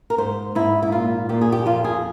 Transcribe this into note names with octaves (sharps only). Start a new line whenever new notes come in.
A#4
G#2 C5
G#2 E4
E4
A#2 F4
A#2 G4
G#4
G4
F2 F4
G#4